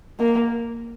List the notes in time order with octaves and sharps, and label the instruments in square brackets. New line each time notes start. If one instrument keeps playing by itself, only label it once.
[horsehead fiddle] A#3